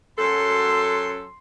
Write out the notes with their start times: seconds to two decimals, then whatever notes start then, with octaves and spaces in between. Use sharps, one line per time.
0.19 F#2 F#3 A4 C6